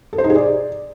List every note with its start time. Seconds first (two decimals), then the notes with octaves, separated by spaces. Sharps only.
0.13 A4
0.18 C5
0.24 D#4
0.30 G#4
0.35 D5